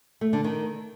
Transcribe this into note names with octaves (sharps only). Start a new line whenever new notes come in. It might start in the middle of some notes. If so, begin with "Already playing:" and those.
A3
D3
D#3